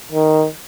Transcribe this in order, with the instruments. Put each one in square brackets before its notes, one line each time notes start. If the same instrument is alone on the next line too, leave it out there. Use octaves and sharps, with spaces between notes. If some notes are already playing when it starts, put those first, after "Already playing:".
[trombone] D#3